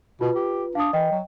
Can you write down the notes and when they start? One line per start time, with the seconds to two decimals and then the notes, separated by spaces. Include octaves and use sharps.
0.21 B2 F4 B4
0.36 G4
0.75 D4 F5 D#6
0.93 E3 D#5 G5
1.12 F#3